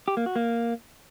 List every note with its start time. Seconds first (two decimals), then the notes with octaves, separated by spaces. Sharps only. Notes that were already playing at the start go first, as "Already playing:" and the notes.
0.08 G4
0.17 A#3
0.26 F#4
0.36 A#3